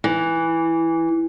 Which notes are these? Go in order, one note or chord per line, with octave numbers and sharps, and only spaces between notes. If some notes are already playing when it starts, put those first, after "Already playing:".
E3